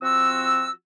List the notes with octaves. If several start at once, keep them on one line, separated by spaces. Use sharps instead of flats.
F3 C4 F4 F#4 E6